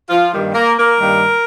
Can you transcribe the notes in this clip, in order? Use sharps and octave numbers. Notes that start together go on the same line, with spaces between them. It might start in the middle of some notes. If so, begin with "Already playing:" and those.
F3 F4
G2 D#3 G3 A#3
A#3 A#4
A#3 A#4
G2 D#3 G3 A#3